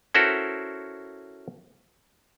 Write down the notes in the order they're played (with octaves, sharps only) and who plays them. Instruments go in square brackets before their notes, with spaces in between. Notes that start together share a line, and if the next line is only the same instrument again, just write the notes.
[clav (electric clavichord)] C#4 E4 F#4 A4 A#4 C5